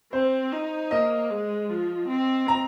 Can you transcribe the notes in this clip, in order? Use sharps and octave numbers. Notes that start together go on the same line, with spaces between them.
C4 C5
D#4
A#3 D#5
G#3
F3
C4
A#5